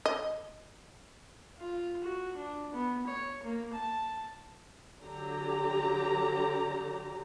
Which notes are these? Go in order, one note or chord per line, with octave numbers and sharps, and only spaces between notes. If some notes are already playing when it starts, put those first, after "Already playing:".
D#5
F4
F#4
D4
B3
C#5
A#3
A5
D3 F#3 G4 A#5